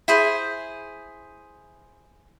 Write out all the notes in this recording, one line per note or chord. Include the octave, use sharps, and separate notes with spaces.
E4 G#4 C5